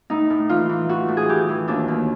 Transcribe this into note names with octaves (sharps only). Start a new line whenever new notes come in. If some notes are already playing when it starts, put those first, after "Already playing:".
A2 D#4
A2
E3 F4
E3
A2 F#4
A2
G#4
E3 G4
E3
D#2 D4
D#2